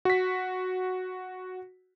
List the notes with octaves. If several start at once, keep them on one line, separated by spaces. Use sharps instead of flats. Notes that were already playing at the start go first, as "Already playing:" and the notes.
F#4 B6